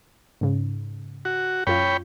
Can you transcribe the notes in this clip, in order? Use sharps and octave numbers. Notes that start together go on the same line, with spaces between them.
G#2 C#3
F#4
F#2 F4 C#5 G5 B5